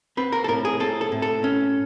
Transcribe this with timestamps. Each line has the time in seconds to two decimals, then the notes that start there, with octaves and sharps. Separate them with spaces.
0.17 C4 B4
0.32 A#4
0.44 A4
0.48 A2 A#4
0.65 G#4
0.80 C4 A4
1.01 A4
1.12 A2
1.22 A4
1.44 C#4